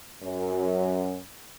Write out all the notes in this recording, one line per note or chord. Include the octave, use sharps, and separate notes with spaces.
F#2